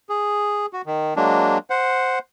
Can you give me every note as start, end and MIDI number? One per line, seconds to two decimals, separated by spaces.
0.09 0.66 68
0.73 0.82 66
0.86 1.14 51
1.16 1.58 54
1.16 1.58 56
1.16 1.58 58
1.16 1.58 62
1.70 2.19 72
1.70 2.19 78